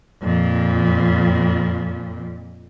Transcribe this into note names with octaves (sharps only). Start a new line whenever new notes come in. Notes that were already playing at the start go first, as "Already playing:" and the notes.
F2 A#2